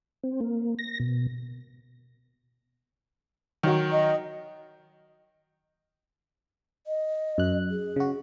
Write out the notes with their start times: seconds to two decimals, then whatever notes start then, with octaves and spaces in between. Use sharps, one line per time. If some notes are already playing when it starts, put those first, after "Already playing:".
0.23 C4
0.41 A#3
0.79 A#6
1.00 B2
3.63 D#3 F#3 F#4
3.92 D#5
6.87 D#5
7.38 F#2 F#6
7.71 G#4
7.96 C#3 F#4